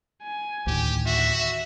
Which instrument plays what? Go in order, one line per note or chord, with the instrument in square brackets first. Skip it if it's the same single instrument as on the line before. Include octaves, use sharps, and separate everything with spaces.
[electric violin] G#5
[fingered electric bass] D2 A2 D#3 [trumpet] G4
[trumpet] F#4 [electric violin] E5